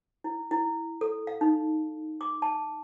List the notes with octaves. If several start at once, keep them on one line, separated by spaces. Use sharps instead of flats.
E4
E4
A4
F5
D#4
D6
A5